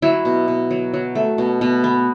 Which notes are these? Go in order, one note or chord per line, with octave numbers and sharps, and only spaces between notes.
F#3 E4
B2
B2
F#3
F#3
A3
B2
B2
B3